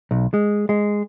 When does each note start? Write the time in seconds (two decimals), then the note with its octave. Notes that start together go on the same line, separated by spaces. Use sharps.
0.11 B1
0.34 G#3
0.69 G#3